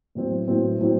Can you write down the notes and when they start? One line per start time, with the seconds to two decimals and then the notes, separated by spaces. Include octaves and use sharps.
0.15 A2 F#3 C4
0.48 A2 F#3 C4
0.79 A2 F#3 C4